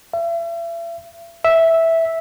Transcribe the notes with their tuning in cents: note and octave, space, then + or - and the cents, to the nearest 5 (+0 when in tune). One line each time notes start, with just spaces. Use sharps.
E5 +40
E5 -5